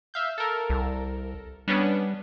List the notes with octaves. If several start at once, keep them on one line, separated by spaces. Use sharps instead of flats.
E5 F5 G6
A4 A#4
C2
G3 B3 C#4 D4